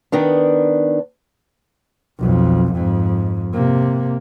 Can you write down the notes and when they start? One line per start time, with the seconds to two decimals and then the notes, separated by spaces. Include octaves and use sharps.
0.12 D#3 B3 D4
2.19 B1 F2
2.73 F2 G#2
3.53 C3 A#3